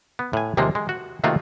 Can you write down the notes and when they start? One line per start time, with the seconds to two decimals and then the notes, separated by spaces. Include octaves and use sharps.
0.19 B3
0.33 A2 G#5
0.57 D#2 C3 F3 G#3 A#3
0.75 G#3
0.89 F#4
1.24 C3 D#3 A3 A#3 F4 F#4